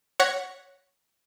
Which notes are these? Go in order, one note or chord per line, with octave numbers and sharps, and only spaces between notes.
C#5 F#5 F#6 A#6 B6